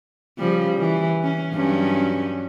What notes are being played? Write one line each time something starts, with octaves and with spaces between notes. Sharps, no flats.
C#3 F3 G3
E3
C#4
G2 F#3 C#4